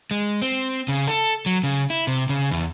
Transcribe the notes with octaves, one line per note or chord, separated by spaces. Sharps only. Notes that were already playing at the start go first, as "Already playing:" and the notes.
G#3
C4
C#3
A4
F#3
C#3
E4
C3
C#3
E2